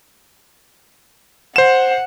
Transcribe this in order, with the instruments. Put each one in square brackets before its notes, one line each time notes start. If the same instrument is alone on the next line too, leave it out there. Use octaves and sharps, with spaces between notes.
[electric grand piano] C5 E7 [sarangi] F#5